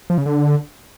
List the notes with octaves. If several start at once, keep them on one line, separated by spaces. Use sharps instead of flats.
F3
C#3
D3